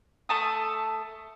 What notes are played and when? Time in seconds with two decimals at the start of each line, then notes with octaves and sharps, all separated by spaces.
0.29 A3 A5 D#6